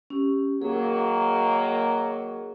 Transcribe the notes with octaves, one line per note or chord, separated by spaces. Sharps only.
C#4 G4
D#3 F#3 A#3 G#4